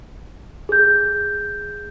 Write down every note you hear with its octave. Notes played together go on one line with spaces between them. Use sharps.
G#4 G6